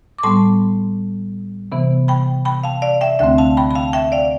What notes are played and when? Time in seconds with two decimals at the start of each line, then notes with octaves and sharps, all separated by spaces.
0.18 D6
0.23 A2 G3 B3 A5 C6
1.72 C3 E3 B3
2.08 G5 B5
2.45 G5 B5
2.64 F5 A5
2.82 D5 F5
3.01 E5 G5
3.19 D2 D3 A3 C4 E5 G5
3.38 F5 A5
3.57 G5 B5
3.71 B5
3.75 F5 A5
3.93 E5 G5
4.12 D5 F5